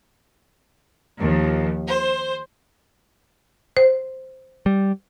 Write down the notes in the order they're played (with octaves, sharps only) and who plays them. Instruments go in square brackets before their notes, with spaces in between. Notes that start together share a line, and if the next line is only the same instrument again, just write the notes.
[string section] D#2 F3
C5
[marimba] C5
[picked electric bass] G3